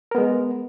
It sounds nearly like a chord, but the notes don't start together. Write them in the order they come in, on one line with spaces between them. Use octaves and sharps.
A#4 B3 G#3